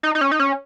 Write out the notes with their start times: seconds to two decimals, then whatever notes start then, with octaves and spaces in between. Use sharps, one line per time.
0.03 D#4
0.15 D#4
0.21 C#4
0.32 D#4
0.40 C#4